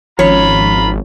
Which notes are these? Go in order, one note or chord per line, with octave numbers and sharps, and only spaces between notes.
G#1 D#3 F3 C#4 F4 C#5 A#5 B5